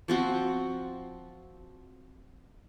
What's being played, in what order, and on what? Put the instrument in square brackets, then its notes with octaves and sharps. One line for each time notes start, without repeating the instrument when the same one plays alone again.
[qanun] F3 C4 F#4